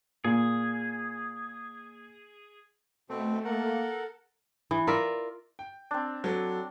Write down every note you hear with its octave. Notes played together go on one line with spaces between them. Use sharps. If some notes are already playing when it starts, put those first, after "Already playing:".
A#2 G#4
B2 A3 C4
A#3 A4 A#4 F#5
E3
F4 A#4 D5 E5
G5
C4 D4
F#3 A4